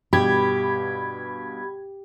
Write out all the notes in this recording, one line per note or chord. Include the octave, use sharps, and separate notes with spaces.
G2 B2 G4 B5 G#6